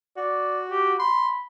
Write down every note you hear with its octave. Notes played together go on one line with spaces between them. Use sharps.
F#4 D5
G4
B5 C6